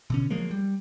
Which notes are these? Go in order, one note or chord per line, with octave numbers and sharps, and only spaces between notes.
B2 D3 C#4
F3 F#3 G#3 A#3
G3